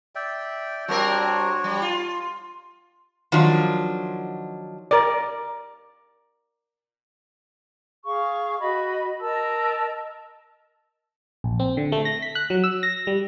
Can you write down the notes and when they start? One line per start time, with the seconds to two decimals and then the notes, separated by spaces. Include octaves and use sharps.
0.15 D5 E5 G5
0.88 G3 C4 D4 F#4 A#4 C#5
1.64 G3
1.82 F4
3.32 D#3 F3 F#3 D4 F4
4.91 A#4 D5
8.05 G#4 F5 C#6
8.60 F#4 D#5 B5
9.21 A#4 D#5 A5 E6
11.44 A#1
11.60 C4
11.77 D3
11.92 A3
12.05 A#6
12.22 B6
12.35 F#6
12.50 F#3
12.64 E6
12.83 A#6
13.07 G3